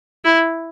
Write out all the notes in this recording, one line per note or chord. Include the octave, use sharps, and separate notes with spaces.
E4